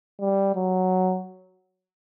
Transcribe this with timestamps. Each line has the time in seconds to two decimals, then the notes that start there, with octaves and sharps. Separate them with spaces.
0.21 G3
0.56 F#3